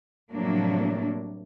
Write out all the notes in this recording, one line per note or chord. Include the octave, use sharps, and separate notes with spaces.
A2 C3 F3 F#3 A#3 D4